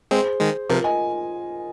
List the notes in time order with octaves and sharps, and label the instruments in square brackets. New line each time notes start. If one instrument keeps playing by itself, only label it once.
[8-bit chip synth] G#3 C4 [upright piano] G#4 C5
[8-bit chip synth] D#3 G#3
[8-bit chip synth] C3 F3 [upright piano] F4 A#4
[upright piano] D#5 G#5